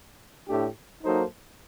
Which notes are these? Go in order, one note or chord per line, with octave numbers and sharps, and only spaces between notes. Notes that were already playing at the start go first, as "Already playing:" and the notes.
A2 A3 D4 G4
F#3 A#3 D#4 A4 C5